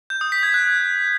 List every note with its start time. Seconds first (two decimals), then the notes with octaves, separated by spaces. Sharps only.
0.10 G6
0.21 D#6
0.32 B6
0.43 G#6
0.54 F#6